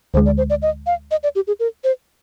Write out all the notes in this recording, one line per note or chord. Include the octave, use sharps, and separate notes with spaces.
D2 D3 G#3 C5
D5
C5
D5
D#5
F5
D#5
D5
G4
G#4
A#4
C5